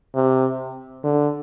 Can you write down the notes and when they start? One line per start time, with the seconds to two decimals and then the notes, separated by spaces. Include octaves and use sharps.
0.15 C3
1.04 D3